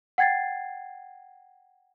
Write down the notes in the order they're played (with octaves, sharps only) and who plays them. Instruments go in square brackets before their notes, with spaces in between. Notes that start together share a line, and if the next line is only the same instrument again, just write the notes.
[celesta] F#5 G5 G#6 A6 C7